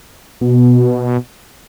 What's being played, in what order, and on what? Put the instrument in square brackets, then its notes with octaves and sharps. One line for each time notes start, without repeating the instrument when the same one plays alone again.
[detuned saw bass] B2